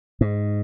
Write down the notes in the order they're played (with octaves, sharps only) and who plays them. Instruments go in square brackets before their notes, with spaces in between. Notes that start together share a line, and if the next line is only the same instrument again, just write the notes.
[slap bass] G#2